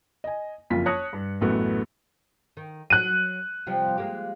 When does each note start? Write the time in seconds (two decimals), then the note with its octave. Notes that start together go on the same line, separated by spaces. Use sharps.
0.24 D#5 G#5
0.70 F#1 F2 F4 B6
0.86 C#5 A5 D#6 F#6 A#6 C#7
1.13 G2
1.41 A1 F#2 A3 B3
2.57 D#3
2.90 F#3 F#6 D#7
3.67 C3 F3 G3
3.98 G#3 A#3 G4